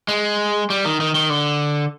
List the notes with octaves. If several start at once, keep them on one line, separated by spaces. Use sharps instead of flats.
G#3
G3
D#3
D#3
D#3
D3